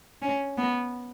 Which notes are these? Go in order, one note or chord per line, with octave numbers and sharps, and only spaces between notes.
C#4
B3